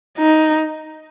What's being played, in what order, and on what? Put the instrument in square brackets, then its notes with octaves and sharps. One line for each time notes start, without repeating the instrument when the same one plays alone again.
[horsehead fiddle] D#4